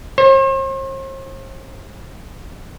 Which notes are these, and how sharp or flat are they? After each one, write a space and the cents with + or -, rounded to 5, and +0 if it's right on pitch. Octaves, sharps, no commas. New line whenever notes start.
C5 +45